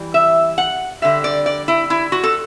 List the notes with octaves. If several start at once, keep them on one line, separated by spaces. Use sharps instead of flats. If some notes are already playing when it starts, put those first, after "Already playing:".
Already playing: E3 G3
E5
F#5
D3 G3 E5
D5
D5
E4
E4
F#4
A4